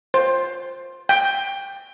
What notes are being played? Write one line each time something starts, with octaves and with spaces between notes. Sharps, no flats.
C5
G5